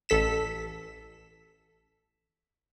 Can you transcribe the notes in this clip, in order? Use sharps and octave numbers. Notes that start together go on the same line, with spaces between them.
A1 A4 B6 E7